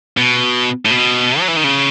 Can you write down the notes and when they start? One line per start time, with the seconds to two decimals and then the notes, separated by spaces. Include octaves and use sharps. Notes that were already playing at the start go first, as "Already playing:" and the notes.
0.17 B2
0.85 A2
0.91 B2
1.40 F#3
1.48 E3
1.56 D#3
1.64 C#3